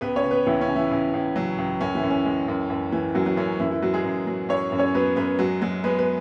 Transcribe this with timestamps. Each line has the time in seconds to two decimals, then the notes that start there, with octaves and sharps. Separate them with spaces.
0.01 C#2 B3 B4
0.16 C#4 C#5
0.24 C#3
0.31 B3 B4
0.46 C#2 E3 E4
0.61 C#4
0.68 C#3
0.76 E3 E4
0.91 C#2
1.14 C#2
1.35 C#3 F#3 F#4
1.58 C#2
1.81 F#2 C#4
1.95 E3 E4
2.03 F#2
2.10 C#4
2.25 G#3
2.48 F#2
2.70 F#2
2.92 E3
3.15 F#2 F#3 F#4
3.26 F#3 F#4
3.37 F#2 C#4
3.59 F#2 E3 E4
3.71 E3 E4
3.82 F#3 F#4
3.93 G#3 G#4
4.04 F#2
4.27 F#3
4.49 F#2 C#4 C#5
4.72 F#2
4.79 C#4 C#5
4.94 F#3 B3 B4
5.16 F#2 B3 B4
5.39 F#3 G#3 F#4
5.61 F#3 G#3 F#4
5.84 G#3 B3 B4
5.99 B3 B4